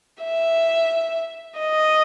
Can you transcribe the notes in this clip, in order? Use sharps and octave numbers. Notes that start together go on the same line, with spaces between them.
E5
D#5